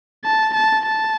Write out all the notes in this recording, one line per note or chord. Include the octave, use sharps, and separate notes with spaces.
A5
A5
A5